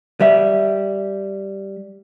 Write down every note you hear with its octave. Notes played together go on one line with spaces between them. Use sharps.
G3 E5